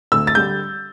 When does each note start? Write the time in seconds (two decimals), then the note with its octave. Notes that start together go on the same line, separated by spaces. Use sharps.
0.12 D2 E6
0.27 A6
0.35 D3 G3 G6